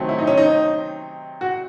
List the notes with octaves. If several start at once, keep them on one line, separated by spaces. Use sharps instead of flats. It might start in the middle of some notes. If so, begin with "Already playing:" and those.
Already playing: C3 D#3 F#3 A3 C4
E4
D#4
C#4
D#4
F#4